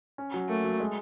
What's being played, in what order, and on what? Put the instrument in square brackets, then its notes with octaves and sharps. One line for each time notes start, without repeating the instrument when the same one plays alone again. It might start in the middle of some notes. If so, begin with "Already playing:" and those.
[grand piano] C#4
F#3
[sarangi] A3 [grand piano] A#3
[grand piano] F#3
G#3